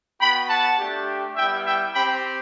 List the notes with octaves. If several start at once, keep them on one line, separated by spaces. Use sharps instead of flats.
B3 F#4 G5 B5
F#5 A5
A3 D4 G4
G3 B3 E4 E5 G5
E5 G5
C4 G4 G5 B5